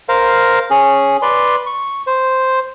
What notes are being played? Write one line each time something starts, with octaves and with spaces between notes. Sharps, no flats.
A#4 C5 F5
C#4 G#4
B4 D5 C6
C#6
C5